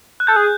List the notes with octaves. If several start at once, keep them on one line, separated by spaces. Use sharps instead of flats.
F#6
A4 G6
G#4